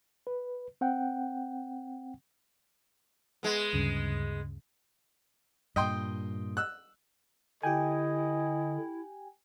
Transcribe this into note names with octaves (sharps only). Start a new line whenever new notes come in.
B4
C4 F#5 G5
G#3 B3
D2 G2 C#3
G2 A#2 D#5 G5 C6
E6 F#6
D3 E4 G4 D#5 G5 G#5